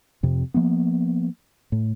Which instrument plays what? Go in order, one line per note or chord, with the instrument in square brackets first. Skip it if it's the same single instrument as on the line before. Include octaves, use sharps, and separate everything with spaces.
[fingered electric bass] F2 C3
F3 A#3 B3
A2